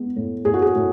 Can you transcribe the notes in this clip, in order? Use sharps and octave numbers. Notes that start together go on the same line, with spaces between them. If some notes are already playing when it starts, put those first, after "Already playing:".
Already playing: G#3 B3
A2
A2 G#4
F#4
G#4
A2